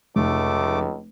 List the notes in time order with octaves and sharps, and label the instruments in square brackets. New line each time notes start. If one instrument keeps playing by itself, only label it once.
[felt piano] F1 [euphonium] C#2 [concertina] A3 D6